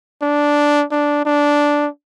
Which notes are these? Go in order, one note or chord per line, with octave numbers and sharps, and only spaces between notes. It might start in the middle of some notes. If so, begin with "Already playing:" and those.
D4
D4
D4